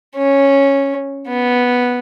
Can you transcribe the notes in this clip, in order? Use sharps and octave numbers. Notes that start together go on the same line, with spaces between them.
C#4
B3